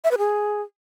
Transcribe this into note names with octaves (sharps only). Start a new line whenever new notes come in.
E5
B4
G#4